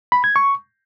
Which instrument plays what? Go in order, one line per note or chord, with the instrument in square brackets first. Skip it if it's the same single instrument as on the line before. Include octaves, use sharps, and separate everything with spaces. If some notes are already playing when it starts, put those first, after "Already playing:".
[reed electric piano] B5
G#6
C#6